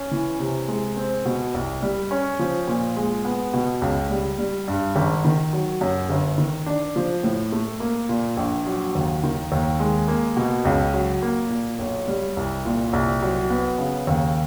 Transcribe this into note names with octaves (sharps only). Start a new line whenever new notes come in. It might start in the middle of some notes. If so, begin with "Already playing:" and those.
Already playing: C#4
E3
C3
G#3
C4
B2
C2
G3
C#4
F3
A#2
G#3
B3
B2
C#2
G3
G3
G2
G#1
D#3
F#3
F#2
G1
D#3
D4
F3
A2
A3
A#3
A#2
A#1
F#3
D#2
D#3
D#2
G#3
A#3
B2
C#2
F#3
A#3
A#2
B1
G3
C2
A#2
C2
F#3
B3
C#3
D#2